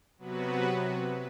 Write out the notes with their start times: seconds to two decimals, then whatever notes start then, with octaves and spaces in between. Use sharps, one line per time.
0.18 C3 F#3 B3 F#4 B4